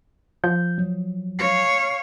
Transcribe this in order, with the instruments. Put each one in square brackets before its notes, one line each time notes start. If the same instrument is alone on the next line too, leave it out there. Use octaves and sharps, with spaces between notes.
[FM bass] F3 [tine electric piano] G6
[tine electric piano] F#3
[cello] C#5 F5